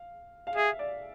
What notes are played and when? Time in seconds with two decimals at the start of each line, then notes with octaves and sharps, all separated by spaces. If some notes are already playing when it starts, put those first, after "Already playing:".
Already playing: F5
0.47 F5
0.56 G#4 E5
0.79 D5